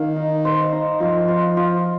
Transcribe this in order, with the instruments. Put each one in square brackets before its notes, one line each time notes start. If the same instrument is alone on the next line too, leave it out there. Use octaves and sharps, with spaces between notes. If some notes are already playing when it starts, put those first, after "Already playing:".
Already playing: [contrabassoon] D#3 [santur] F5
[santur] D#4
C5
D#4
[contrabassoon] F3 [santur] F4
[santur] F4
F4